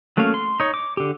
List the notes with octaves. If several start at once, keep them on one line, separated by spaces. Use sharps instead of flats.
F#3 A3 A#3 C#4 F5
C6
D#4 C#5
D6
D3 G4